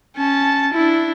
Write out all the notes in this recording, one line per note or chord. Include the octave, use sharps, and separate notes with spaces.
C#4 A5
D4 E4